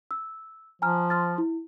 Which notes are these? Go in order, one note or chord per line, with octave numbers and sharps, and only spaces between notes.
E6
F3 G#5 A#5 F6
C6 F6 A6
E4